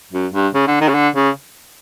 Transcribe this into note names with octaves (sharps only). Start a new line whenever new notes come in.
F#2
G2
C#3
D3
D#3
C#3
D3
C#3